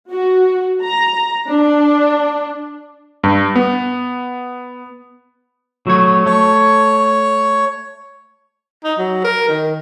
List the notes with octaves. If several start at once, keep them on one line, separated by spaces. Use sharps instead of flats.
F#4
A#5
D4
G2
B3
F#3 A3 C#5
A3 C#5
D#4
F#3
A#4
D#3